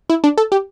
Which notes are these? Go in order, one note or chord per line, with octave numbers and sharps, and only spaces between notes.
E4
D4
A4
G4